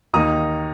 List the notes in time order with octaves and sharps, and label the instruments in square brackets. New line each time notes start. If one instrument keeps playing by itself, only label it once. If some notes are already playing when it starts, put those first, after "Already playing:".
[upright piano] D#2 D#3 A#3 D#4 A#5 D#6